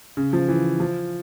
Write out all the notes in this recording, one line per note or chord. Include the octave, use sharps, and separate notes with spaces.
C#3
F3
E3
F3